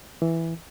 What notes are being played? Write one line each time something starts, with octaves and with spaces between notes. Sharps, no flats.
E3